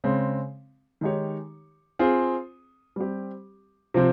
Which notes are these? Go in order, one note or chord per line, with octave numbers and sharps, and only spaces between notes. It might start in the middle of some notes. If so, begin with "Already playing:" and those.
C#3 G#3 C4
D#3 G#3 D#4 G4 C#5
C4 F4 G#4
G3 C4 G4
C3 F3 C4